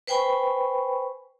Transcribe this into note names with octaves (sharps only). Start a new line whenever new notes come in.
B4 C5 G5 G#5 B5 C#6